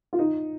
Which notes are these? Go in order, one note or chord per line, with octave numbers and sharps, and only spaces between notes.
F4
D#4